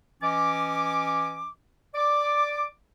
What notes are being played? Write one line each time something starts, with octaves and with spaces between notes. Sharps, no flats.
E3 C#4 D#5 D6
D5 D6